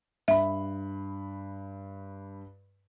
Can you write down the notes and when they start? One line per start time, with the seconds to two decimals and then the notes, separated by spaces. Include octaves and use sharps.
0.28 G2 E5 B5